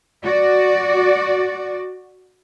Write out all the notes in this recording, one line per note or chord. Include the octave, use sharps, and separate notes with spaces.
F#4 D5